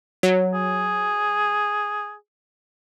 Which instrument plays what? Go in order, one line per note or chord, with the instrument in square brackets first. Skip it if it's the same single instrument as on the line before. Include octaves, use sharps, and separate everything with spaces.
[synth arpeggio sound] F#3
[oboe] G#4